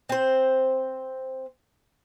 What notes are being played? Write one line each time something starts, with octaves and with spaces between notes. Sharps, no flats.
C4 C5